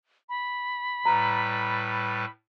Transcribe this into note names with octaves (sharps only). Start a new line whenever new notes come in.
B5
A2 G3 B4 A#5